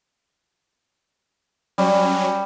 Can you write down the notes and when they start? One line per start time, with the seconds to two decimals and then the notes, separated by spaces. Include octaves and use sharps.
1.78 F#3 G3 C#4